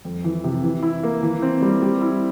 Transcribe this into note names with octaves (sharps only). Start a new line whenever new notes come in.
F2
E3
C3
E3
E4
A#3
E3
C4
G3
G3
E4